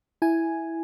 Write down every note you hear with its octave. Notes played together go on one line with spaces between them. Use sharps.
E4 G#5